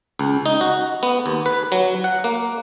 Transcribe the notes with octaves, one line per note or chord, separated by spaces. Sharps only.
C#2
D#4
F#4
B3
D#2
B4
F#3
F#5
A#3